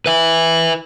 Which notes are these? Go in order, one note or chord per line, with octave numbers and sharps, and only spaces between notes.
B4 E5